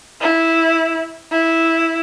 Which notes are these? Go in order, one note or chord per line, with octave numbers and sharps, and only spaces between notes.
E4
E4